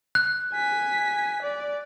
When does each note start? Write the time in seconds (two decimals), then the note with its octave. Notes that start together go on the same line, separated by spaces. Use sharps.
0.15 F#6
0.52 G#5 B6
1.42 D5